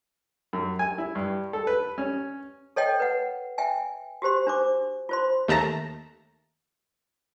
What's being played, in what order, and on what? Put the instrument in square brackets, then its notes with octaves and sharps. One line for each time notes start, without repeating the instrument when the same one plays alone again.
[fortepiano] F#2
G#5
E4
G2
A4
B4
C#4
[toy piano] A4 C#5 D#5 G5
B4 F#5
E5 G5 G#5
F#4 G4 C5 C6
D4 C5 D6
F4 C5 C6
[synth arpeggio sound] D#2 A3 A5 A#5 A#6